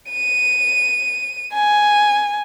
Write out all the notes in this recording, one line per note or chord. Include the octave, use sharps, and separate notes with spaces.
D#7
G#5